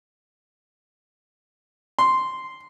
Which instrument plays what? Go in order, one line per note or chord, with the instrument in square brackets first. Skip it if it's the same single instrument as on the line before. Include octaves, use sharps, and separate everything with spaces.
[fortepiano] C6